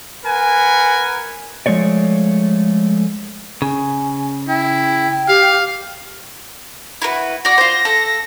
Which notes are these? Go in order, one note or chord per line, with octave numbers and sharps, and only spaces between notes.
A#4 B4 F#5 G#5
F3 G#3 A3 C#5 D5
C#3 G#5
E4 G5
G4 F5
E4 F#4 B4
F#4 D5 A#6
F4 C5
A4